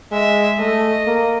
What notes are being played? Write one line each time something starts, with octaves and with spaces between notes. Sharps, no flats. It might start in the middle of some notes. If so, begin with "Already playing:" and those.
G#3 E5
A3 D#5
A#3